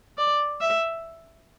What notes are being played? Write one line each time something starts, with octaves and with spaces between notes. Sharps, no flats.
D5
E5